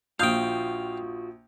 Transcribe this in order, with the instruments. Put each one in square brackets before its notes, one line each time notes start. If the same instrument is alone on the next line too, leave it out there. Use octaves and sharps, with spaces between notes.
[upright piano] A#1 D#6 G6 [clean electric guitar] F4 F#4 [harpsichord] F5 G5